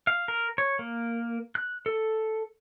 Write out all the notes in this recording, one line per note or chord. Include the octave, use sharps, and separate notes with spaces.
F5
A#4
C#5
A#3
F#6
A4